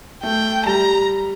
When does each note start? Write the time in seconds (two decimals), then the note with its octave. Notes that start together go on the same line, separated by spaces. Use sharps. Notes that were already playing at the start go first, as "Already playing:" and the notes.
0.23 A3 G5
0.66 G3 A#5